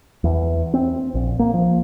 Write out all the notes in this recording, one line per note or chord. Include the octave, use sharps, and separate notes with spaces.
E2
C4
A#1
A#3
F3